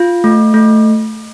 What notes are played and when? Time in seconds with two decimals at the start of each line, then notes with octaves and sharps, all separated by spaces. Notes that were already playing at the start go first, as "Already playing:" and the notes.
Already playing: F4
0.24 A3
0.54 A3